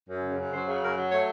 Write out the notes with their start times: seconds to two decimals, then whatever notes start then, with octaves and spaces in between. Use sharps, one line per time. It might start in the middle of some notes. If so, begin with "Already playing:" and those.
0.09 F#2
0.23 C#3
0.38 F#2
0.52 F#3 C5
0.67 C#3
0.82 F#2 A#4
0.97 F#3
1.11 A3 C#5